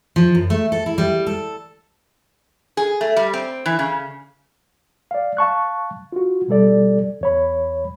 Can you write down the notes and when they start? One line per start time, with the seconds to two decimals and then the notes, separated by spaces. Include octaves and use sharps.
0.16 F3
0.35 F#2
0.50 A3
0.72 A4
0.86 E4
0.98 G3
1.26 A4
2.77 G#4
3.01 A3
3.16 G3
3.34 C4
3.66 E3
3.79 C#3
5.11 D5 F5
5.37 F5 A5 C#6 F#6
6.12 F4 F#4
6.48 B2 G3 A4 D5
7.21 E2 C#5 B5